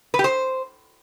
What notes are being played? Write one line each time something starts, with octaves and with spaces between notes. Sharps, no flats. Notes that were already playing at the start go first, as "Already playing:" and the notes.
B4
G4
C5